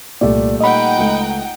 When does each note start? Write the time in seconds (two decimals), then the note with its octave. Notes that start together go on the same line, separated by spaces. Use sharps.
0.21 C2 A#2 G3 A3 D5
0.61 D#4 D#5 F#5 G5 B5
0.98 C#2 A3